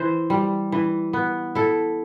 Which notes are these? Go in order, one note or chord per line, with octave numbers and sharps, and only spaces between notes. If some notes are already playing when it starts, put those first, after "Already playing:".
Already playing: E3 C5
G3
E3
B3
E4 A4